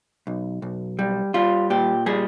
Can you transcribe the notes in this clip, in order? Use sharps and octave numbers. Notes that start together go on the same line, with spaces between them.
B1
B1
G3
G3 F4
A#2 G4
G3 G#4